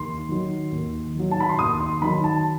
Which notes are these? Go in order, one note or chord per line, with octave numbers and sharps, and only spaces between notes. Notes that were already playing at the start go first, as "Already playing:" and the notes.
Already playing: D#2 C6
D#3 F#3
D#2
D#3 F#3
A5
B5
C6
D#2 D#6
C6
D#3 F#3 B5
A5